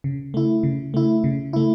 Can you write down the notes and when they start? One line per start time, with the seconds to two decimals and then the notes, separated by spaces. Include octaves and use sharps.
0.04 C#3
0.34 A3 E4
0.63 C#3
0.94 A3 E4
1.24 C#3
1.53 A3 E4